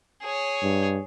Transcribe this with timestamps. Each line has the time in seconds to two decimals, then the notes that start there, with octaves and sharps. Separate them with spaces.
0.23 G#4 C#5
0.62 G2